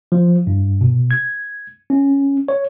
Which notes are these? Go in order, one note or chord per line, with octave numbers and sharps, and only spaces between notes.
F3
G2
B2
G#6
C#4
C#5